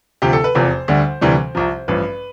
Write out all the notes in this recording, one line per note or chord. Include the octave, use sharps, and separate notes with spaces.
D2 C3 F3 G4
A4
B4
F1 E2 C3 F3 C5
D2 D3 G3
D2 C3 E3 G3
C2 C3 F3
A1 G2 F3 B4